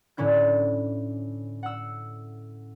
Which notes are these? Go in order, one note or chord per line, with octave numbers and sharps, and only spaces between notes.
A2 D3 C#4 E4 G6
F#5 E6